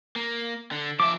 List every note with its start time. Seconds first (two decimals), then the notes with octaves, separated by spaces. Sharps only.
0.16 A#3
0.71 D3
1.00 F3 E5 D6